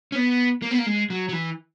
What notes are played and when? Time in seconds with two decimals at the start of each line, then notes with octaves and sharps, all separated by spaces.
0.12 C#4
0.15 B3
0.62 A#3
0.71 B3
0.78 A#3
0.86 G#3
1.10 F#3
1.29 F#3
1.33 E3